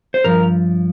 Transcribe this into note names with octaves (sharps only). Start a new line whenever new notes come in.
C5
G2 F3 A#4